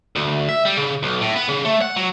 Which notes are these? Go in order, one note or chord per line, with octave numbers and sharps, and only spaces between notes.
D2
E5
G3
C#3
B1
A2
B3
C#3
A3
F#5
F#3